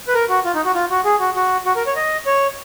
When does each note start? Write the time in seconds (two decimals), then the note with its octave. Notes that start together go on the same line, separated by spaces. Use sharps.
0.08 B4
0.14 A#4
0.29 F#4
0.45 F4
0.55 D#4
0.65 F#4
0.75 F4
0.90 F#4
1.05 G#4
1.20 F#4
1.36 F#4
1.66 F#4
1.76 A#4
1.87 C#5
1.96 D#5
2.26 C#5